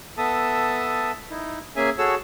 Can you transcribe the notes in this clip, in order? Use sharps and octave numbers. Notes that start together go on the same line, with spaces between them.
B3 A4 E5 A5 D#6
D#4 E4
A#3 C#4 G#4 E5 G#5
F#4 G#4 A4 C#5 E6